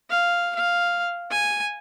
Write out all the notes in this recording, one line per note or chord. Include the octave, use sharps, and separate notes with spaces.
F5
F5
G#5